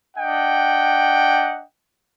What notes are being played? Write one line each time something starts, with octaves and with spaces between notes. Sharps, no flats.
D4 D#5 F#5 G5